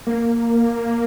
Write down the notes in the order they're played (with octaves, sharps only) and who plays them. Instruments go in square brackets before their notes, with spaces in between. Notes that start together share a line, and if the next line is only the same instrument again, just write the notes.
[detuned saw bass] A#3